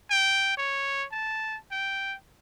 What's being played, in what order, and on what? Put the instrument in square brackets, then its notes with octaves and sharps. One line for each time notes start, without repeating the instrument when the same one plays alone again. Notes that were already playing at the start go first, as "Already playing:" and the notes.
[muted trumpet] G5
C#5
A5
G5